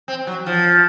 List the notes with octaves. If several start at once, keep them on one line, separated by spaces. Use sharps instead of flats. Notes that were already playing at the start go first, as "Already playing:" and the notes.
C4
F#3
F3